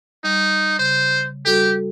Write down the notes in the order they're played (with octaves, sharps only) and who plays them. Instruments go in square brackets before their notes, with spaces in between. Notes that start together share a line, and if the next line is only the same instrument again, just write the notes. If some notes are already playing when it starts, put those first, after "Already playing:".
[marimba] G3 [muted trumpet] D#4
[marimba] C#3 [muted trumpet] C5
[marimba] G3 F#4 A4 [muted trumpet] G4